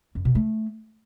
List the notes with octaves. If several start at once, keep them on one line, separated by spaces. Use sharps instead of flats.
F#2
B2
A3